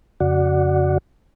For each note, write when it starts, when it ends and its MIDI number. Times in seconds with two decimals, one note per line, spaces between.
0.20 0.98 41
0.20 0.98 49
0.20 0.98 66
0.20 0.98 74
0.20 0.98 78